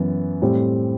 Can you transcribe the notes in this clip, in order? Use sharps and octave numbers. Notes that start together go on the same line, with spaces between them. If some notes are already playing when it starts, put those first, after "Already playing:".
Already playing: F#2 E3 B3
A2 G3 C4